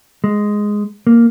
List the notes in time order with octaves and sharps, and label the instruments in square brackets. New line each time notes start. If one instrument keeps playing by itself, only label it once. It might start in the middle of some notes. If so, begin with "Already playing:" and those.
[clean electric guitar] G#3
A#3